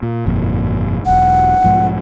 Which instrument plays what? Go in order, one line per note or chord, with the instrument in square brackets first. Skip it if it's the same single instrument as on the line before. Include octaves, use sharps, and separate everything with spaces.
[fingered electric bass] A#2
G1 F2 A#2
[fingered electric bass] E1 B1 [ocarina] F#5
[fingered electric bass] B1 G#2 F3